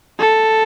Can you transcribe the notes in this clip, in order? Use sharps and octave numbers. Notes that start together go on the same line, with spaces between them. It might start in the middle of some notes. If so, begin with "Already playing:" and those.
A4